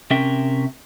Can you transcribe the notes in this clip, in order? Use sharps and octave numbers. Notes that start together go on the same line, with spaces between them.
C3 C#4 A#4 E5 G5